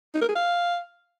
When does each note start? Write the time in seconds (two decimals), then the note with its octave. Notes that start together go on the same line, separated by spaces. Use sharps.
0.14 D#4
0.21 A#4
0.28 G#4
0.35 F5